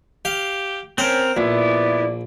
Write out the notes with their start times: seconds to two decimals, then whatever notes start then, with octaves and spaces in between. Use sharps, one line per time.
0.25 G4 F5
0.98 C4 C#4 A#4 C5
1.37 A#1 B3 E4 D5